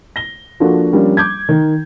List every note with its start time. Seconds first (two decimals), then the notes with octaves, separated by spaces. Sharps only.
0.16 A#6 G7
0.60 F3 A#3 D4 F#4 A4
0.92 F3 G3 A#3 C#4 D4
1.17 D6 G6 G#6
1.49 D#3